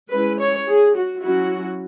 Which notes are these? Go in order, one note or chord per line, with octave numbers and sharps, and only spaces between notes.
G#3 C#4 E4 B4
C#5
G#4
F#4
F#3 C#4 E4 F#4